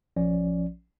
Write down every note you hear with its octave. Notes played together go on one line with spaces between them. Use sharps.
A#1 F3 C#4 D5